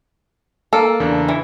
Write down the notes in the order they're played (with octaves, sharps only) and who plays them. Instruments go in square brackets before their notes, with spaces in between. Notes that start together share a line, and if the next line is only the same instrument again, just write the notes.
[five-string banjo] A#3 A4
[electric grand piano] E2 C#3 D4
[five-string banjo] E3